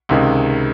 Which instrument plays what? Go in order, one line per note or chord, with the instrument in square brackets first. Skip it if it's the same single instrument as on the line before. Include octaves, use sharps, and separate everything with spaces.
[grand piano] C#2 C3 D#3 G#3